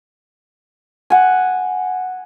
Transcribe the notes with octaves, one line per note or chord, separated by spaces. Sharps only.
F#5 G#5